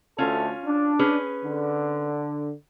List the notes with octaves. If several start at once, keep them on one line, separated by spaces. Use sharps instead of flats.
D2 A3 C#4 F4 A4
D4
C#4 G#4 B4
D3